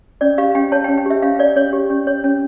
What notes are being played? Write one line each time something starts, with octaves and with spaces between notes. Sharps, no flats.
C#4 D5
G4 F5
C#4 G5
C#5 A5
G5
C#4
G5
G4 E5
C#4 F5
C#5 D5
C#4 C#5
G4
C#4
C#5
C#4